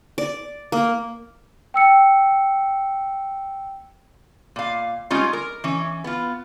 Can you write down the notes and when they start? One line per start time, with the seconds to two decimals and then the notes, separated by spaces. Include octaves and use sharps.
0.18 D5
0.72 A#3
1.74 G5 E6 C#7
4.56 A#2 F5
5.11 G3 G#3 C#4 D#4 F4
5.33 A#4
5.64 E3 C#4
6.04 B3 F4